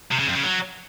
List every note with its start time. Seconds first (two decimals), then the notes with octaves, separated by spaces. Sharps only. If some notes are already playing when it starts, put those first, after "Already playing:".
0.11 C3
0.19 C#3
0.27 F2
0.35 C#3
0.43 F#3